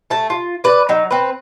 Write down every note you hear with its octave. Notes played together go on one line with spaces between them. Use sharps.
A3 A5
F4
B4 D5
F#3 D#4
C4 B4